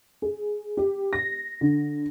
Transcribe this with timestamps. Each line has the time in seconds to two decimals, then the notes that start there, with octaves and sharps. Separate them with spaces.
0.22 G#4
0.77 G4
1.13 A#6
1.61 D3